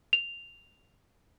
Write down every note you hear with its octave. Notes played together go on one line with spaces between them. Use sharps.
F7